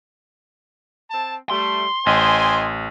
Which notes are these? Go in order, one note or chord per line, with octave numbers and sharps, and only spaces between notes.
C4 A5
G3 A3 C6
A1 C5 D#5 G5 G#5